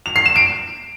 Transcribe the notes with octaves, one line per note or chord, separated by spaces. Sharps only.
F7
C7
E7
D7